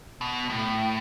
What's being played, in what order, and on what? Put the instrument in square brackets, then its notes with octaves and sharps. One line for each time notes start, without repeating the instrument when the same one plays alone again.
[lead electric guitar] B2
A2